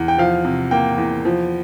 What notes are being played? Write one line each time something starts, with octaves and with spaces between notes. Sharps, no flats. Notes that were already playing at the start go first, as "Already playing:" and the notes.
Already playing: E2
G5
F3 F5
C3
A#3 G5
E2
F3